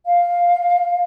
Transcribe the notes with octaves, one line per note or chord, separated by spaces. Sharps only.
F5